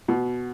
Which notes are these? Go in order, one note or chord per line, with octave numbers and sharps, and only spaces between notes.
B2